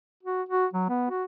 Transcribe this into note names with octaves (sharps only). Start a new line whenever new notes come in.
F#4
F#4
F#3
B3
F#4